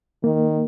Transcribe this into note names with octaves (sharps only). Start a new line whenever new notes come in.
D#3 A#3